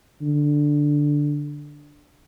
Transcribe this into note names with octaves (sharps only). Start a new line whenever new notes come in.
D3